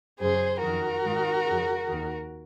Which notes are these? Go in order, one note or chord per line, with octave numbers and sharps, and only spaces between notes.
F#2 C#3 G#4 C5
F2 D#3 F#4 A#4
G#2 D#3
F2 C#3
D#2 D#3